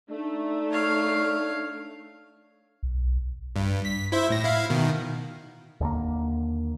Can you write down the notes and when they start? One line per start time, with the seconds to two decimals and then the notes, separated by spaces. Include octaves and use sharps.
0.11 A3 D4 D#4
0.71 C#5 F5
2.83 B1
3.56 G2
3.85 B6
4.12 E4 C5 E5
4.30 A2 A#6
4.45 E4 F5
4.70 B2 D#3
5.81 D#2 D3 A#3